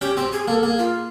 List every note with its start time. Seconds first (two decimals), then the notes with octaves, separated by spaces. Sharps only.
0.01 C#4 G4
0.17 C4 G4
0.32 G#4
0.48 A#3 A4
0.63 A#3 G#4
0.78 F4